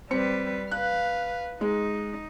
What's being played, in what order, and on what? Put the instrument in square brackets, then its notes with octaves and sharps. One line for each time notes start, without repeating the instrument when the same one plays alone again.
[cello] G3 B4 [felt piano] C4 C#7
[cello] B4 F5 [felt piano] F#6
[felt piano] G#3 [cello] D#4